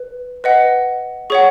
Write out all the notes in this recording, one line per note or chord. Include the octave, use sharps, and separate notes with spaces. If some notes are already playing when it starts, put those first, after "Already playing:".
Already playing: B4
B4 D#5 F#5
G#4 C#5 F#5 C#6